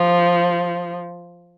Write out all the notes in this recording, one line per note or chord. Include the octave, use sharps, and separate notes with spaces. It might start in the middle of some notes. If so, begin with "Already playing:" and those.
Already playing: F3